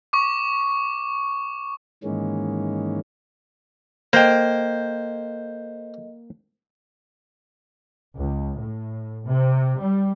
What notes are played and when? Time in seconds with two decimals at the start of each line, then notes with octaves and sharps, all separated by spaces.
0.13 C#6 D6
2.04 G#2 D#3 E3 G#3 A#3 C#4
4.13 A#3 A4 C5 D#5 G5
8.18 C#2
8.60 A2
9.27 C3
9.81 G3